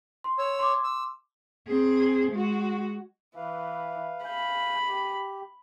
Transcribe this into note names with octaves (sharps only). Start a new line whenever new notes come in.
C6
C#5 E6
C6 D6
E6
C4 G#4
G#3 F#4
E3 B4 F5
F5 G#5 B5 G6
G4